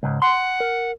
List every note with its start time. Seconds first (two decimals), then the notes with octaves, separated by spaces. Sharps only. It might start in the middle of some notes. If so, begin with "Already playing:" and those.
0.03 C#2 G#2
0.22 F#5 C6
0.60 A#4